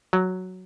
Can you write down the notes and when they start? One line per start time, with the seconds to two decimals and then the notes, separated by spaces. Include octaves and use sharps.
0.13 F#3